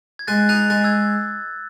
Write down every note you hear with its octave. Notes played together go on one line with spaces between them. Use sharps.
G#6
G#3 F#6 A6
D#4 F#6 A6
G#3 F#6 A6
E6 G#6